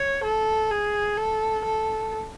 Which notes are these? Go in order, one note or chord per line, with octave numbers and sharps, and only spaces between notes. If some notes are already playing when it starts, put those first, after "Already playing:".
Already playing: C#5
A4
G#4
A4
A4